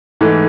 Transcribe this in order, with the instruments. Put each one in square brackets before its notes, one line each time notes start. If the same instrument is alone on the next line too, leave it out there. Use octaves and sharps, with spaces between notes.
[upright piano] G#2 E3 A3